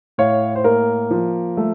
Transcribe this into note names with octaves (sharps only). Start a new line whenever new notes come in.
A2 C#5 F5
C5
A#3 A#4
F3
A3